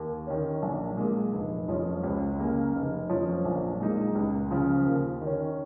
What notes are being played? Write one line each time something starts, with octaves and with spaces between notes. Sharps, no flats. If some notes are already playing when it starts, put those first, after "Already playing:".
Already playing: D#2
D#3 C#4
A#1
A#2 G#3
F1
F2 F3 C#4
C#2
C#3 A#3
F1
F2 F3 C#4
A#1
A#2 G#3 D#4
C#2
C#3 F3
D#2
D#3 C#4